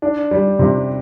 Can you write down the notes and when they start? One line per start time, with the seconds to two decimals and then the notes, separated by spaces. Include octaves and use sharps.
0.02 D4
0.31 G3
0.59 C3